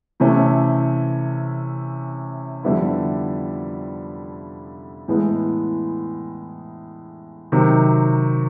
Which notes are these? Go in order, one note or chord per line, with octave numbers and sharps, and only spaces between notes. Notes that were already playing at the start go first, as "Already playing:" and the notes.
C3 E3 A3 C#4
F2 D3 G3 B3 E4
A2 E3 G#3 B3
C3 D#3 F#3